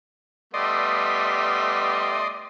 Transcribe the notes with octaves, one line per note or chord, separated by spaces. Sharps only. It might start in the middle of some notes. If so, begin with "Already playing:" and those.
G3 A3 B3 D5 D#5 C6